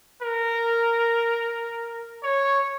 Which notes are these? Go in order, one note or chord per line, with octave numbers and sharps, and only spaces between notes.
A#4
C#5